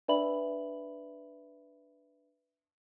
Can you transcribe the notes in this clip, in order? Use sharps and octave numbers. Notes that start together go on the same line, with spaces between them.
D4 B4 D5 E5 B5 F#7